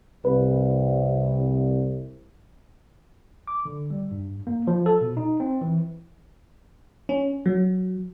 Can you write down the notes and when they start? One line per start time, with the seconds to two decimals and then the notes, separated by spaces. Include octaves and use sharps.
0.25 C2 B4
3.47 D6
3.65 D3
3.90 G3
4.11 G2
4.47 A#3
4.67 F3
4.86 A4
5.01 B2
5.17 D#4
5.40 C4
5.61 E3
7.09 C#4
7.46 F#3